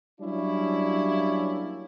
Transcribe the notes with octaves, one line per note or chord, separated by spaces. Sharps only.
F#3 G3 A#3 C#4 D4 E4